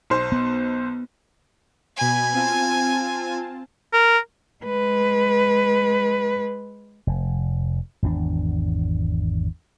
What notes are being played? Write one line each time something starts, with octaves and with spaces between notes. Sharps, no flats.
B1 C5
B3
B2 G#5 B5 G#6
C4 F4 A5
A#4
G#3 B4
F1
G#1 E2 C4 D4